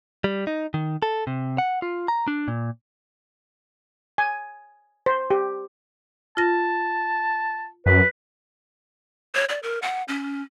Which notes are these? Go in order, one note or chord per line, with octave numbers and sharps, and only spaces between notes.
G3
D#4
D#3
A4
C3
F#5
F4
A#5
D4
A#2
G#5
C5
G4
F4 A5 A#6
F#2 B4
C#5
D5
A#4
F#5
C#4